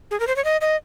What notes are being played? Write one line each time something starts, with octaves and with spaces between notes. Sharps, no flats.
G#4
A#4
C5
C#5
D#5
D#5